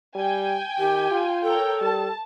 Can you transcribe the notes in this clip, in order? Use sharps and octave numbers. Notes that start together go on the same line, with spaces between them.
G3 G5 G#5
D#3 G4
F4
A4 A#4 C#5 G5
G3 A5